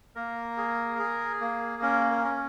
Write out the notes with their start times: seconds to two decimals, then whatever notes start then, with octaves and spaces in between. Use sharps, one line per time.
0.15 A#3 A#4
0.57 G#4
0.99 G#4
1.41 A#3
1.82 C#4 A#4
2.11 A#4
2.24 C#4